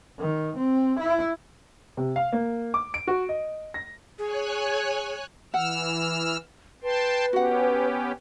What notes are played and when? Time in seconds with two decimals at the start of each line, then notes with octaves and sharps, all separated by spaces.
0.19 D#3
0.57 C4
1.00 E4
1.97 C3
2.16 F5
2.32 A#3
2.74 D6
2.94 D7
3.07 F#4
3.29 D#5
3.74 A#6
4.19 G#4 C#5 G#5 F#6
5.54 E3 F#5 E6 F6
6.83 B4 G5 A5 C6
7.33 B3 C#4 F#4 G4 F#5